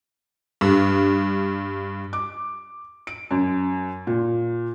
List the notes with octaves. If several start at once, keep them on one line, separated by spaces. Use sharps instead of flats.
G2
D6
D7
F#2
A#2